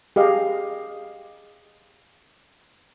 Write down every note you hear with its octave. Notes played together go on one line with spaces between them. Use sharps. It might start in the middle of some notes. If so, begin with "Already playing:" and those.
G4 G#4 D#5 F5